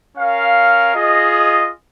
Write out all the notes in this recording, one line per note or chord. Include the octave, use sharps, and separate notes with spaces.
C#4 A#4 F5
F4 G#4 D#5